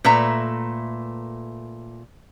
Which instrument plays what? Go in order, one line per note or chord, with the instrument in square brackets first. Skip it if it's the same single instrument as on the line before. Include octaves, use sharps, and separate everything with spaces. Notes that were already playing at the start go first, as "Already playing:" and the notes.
[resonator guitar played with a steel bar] A#2 A3 B4 E5 A#5